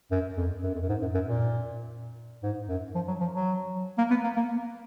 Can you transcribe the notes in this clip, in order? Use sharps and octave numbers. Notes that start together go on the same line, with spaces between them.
F#2
F2
F#2
F2
F#2
G#2
F#2
F#2
A#2
G#2
F#2
F3
F#3
F3
F#3
A#3
B3
A#3
A#3